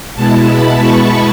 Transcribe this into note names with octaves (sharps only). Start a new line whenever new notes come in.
B2 G#3 B3 E4 A5
B5
C#6